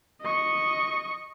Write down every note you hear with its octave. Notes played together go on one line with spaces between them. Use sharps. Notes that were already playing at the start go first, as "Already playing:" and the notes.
D#5 C#6